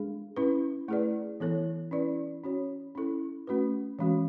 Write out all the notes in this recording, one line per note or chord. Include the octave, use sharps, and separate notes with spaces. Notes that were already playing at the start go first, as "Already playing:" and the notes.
Already playing: G#3 D4 G#4
C#4 E4 B4
A3 E4 G#4 B4 D5
E3 B3 E4 A4 C#5
C#4 E4 B4 D5
C#4 F#4 C#5
C#4 E4 A4
A3 C#4 F#4 B4
E3 G#3 C#4 F#4